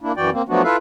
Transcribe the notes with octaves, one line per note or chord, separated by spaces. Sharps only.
A#3 D4 E4
F#2 E3 F#4 D5 G5
A#3 C4
F3 F#3 A3 B3 D4 F#4
E4 F4 A4 B4 E5 F5